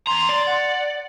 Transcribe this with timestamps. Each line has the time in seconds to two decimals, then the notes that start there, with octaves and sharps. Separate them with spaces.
0.07 E2 A#5 C6
0.29 D5
0.47 F#5